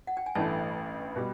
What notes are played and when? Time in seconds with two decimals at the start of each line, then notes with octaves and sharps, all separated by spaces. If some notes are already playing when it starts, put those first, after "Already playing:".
0.07 F#5
0.17 G5
0.26 G#5
0.35 A1 G2 E3 A3 A5
1.16 B2 G3